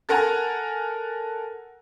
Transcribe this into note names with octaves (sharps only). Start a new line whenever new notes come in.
A4 A#4 F#5 G#5 A#5